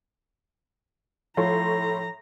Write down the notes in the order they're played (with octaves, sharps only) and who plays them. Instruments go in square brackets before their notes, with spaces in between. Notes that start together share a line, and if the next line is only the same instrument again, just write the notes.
[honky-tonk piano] A2 C#5 C6 [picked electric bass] F3 [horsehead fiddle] A#5